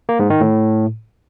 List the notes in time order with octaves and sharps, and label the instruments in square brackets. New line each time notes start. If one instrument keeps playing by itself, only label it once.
[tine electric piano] A#3
G#2
D#3
A2